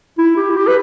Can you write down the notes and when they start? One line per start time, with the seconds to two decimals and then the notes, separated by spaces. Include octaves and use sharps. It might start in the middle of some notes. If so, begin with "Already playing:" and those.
0.18 E4
0.36 G4
0.50 E4
0.57 G4
0.67 B4